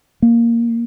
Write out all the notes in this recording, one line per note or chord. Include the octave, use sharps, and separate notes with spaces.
A#3